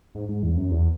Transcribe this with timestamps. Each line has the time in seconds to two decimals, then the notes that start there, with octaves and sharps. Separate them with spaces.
0.15 G#2
0.29 G#2
0.43 E2
0.57 F#2
0.71 E2